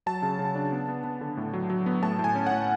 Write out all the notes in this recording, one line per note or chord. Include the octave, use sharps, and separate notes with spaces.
F#3 A5
C#3
C#3
D4
B3
B3
B3
D3
A2
F#3
F#3
B3
A2 A5
A2
G#5
C#4
A2 F#5